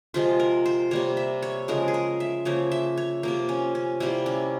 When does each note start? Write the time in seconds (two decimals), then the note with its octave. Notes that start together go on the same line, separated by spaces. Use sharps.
0.14 C3 F3 G#3 F4
0.39 A#4
0.66 C5
0.91 C3 G3 A#3 C#5
1.17 E5
1.42 C#5
1.68 C#3 F3 G#3 A#4
1.88 G#4
1.94 A#4
2.20 E5
2.45 C#3 F3 A#3 C#5
2.71 E5
2.97 C#5
3.23 C3 F3 A#3
3.49 C#4
3.75 C#4
4.00 C3 G3 A#3 E4
4.26 C#4